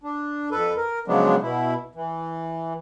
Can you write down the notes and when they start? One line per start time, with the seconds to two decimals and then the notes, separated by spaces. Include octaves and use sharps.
0.04 D4
0.52 F2 A4 B4
0.77 A#4
1.08 C#3 F3 F#3 G#3 B3 D4
1.42 B2 E4
1.95 E3